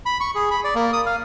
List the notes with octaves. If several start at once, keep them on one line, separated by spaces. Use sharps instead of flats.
B5
C#6
G#4
B5
D5
A#3
D#6
F5